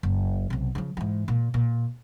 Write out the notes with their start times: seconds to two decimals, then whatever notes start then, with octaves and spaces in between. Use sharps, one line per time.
0.03 F#1
0.50 B1 C3
0.75 C#3 F3
0.97 G#2 E3
1.28 A#2
1.54 A#2